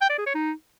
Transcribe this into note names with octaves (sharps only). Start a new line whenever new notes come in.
G5
D5
G#4
C#5
D#4